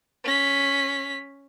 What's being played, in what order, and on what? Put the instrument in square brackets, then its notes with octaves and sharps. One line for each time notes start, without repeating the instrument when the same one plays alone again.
[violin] C#4 B6